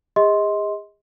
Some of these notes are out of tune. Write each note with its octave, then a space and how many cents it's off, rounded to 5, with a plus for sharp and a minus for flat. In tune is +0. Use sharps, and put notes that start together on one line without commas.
G#4 -40 D#5 +25 C6 +0